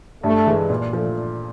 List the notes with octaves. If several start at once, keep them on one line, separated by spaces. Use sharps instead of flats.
G2 A3
E3 G#3
A#2
F3 A3